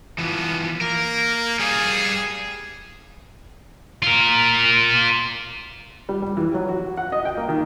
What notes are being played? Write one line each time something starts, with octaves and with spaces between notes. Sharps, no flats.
E3 F3 B3
A#3 A#4
G3 G#4 F5
F4 A#4
G3
G3
E3
F#3
F#4
F#5
D#5
G5
A#3
D#3